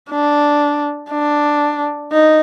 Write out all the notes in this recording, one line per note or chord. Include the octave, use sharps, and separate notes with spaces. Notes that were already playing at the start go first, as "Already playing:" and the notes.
D4
D4
D#4